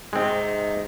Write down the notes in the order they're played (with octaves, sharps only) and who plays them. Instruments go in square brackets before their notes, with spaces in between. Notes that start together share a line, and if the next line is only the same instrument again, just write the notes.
[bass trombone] G#2 [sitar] C3 D#3 [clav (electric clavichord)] G#3 C4